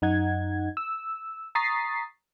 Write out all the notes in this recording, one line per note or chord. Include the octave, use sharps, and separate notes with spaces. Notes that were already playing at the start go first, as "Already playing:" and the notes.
F#2 D#4 F#5 G#6
E6
A#5 C#6 D#6 A6 B6 C7